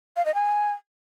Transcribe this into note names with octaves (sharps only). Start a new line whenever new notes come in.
F5
D#5
G#5